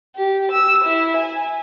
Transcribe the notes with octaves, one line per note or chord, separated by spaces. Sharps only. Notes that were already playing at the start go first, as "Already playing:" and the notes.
G4
E6
E4
G#5